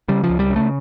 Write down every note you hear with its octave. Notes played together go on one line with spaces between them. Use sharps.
C#3 G3
F3
C#2
G3
C#3
A3